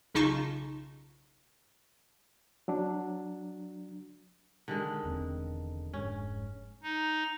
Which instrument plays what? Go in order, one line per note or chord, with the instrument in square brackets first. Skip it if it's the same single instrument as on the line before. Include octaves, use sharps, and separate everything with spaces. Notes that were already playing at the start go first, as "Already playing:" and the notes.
[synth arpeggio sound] B1 C#3 D#4 F4 A5 C#6
[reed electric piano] F#3 D4
[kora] D3 D#3 G#3
[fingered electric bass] E1 E2 C4
[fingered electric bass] F1 G#2 [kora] C#4
[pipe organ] D#4